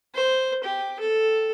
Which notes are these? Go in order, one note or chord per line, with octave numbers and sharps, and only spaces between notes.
C5
G4
A4